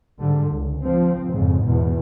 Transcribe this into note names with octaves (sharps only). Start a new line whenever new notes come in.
G#2 D3 G3
C#2
F3 C4
F2 G#2 C#3
E2 B2